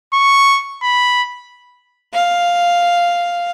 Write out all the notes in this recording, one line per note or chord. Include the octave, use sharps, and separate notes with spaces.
C#6
B5
F5